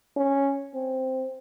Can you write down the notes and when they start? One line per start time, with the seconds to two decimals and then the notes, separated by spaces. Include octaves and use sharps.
0.17 C#4
0.75 C4